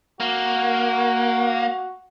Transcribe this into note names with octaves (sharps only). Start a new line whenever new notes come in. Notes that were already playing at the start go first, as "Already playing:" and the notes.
A#3 F#4